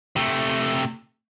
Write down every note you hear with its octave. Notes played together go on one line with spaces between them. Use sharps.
C3 A3